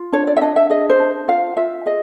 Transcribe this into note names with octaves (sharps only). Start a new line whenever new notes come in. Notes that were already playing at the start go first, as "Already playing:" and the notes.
Already playing: F4
D4 C#5
D5
E5
D4 D#5
E5
G#4 D#5
C5
D4
F4 F5
F4 E5
G#4 D#5